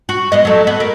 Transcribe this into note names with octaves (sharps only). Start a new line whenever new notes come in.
F#4
G#3 B3 D#5
F#3 A3
B3
A#4